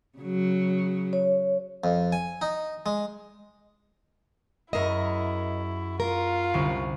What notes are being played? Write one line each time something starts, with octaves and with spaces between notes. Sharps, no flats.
C#3 F#3
C#5
F2
G#5
D#4
G#3
F#2 E4 G#4 A#4 D#5 E5
F4 A#4
C2 D3 C#4